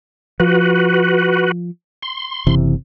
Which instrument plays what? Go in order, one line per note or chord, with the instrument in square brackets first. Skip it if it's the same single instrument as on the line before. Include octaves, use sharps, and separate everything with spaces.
[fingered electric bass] F3 [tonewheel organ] F#4 B4
[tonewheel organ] C6
[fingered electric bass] F#1 C3 E3